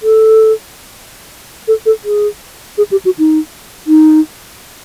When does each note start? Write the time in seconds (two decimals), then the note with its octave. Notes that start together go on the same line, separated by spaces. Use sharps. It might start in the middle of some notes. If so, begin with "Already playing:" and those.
0.03 A4
1.68 A4
1.86 A4
2.05 G#4
2.78 G#4
2.91 G4
3.05 F#4
3.19 D#4
3.87 D#4